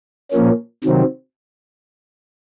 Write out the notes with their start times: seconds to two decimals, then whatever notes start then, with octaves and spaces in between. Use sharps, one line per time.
0.32 A#2 F3 A#3 C#4
0.84 C3 D#3 F#3 C4